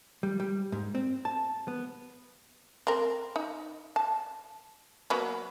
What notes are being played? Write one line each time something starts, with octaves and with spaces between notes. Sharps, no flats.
G3
G3
G#2
C4
A5
B3
C4 A#4
D#4
A5
F#3 A#3 B3